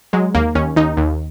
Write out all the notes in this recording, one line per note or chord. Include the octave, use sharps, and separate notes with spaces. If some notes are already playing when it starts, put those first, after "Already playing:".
F#3 G#3
D#2 A#3
D#2 C#4
D#2 D#4
D#2